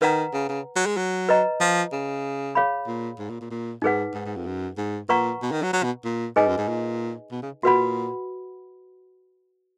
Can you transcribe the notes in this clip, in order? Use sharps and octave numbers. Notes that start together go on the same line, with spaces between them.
D#3 B4 F#5 A#5
C#3
C#3
F#3
G#3
F#3
B4 D#5 A#5
F3
C#3
G#4 C#5 F5 B5
A#2
G#2
A#2
A#2
A#2
G#2 D#4 G#4 B4 F#5
G#2
G#2
F2
F#2
G#2
A#2 B4 F#5 A#5 C#6
B2
D#3
F#3
F#3
B2
A#2
G#2 D#4 G#4 B4 D#5 G#5
F#2
G#2
A#2
B2
C#3
A#2 F#4 B4 F#5 B5